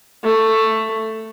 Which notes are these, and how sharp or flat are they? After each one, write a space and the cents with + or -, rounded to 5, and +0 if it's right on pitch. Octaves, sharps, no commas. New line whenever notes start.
A3 +10